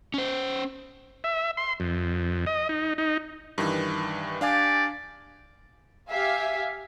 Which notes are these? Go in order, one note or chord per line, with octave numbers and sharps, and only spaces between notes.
C#4 C5
E5
C6
F2
D#5
D#4
D#4
G2 D#3 E3
D4 G4 D5 F5 G#5
G4 E5 F5 G#5